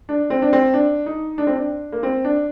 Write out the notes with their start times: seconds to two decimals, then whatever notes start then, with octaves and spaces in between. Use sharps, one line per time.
0.09 D4
0.30 C4
0.42 D4
0.53 C4
0.74 D4
1.06 D#4
1.38 D4
1.47 C4
1.56 D4
1.92 A#3
2.03 C4
2.25 D4